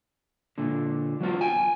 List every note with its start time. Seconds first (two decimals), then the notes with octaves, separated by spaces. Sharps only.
0.58 A#2 D3
1.21 F#3 B3 F4 F#4
1.41 G5 G#5